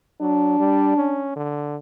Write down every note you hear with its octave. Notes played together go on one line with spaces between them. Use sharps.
F#3 D4
G3
C#4
D3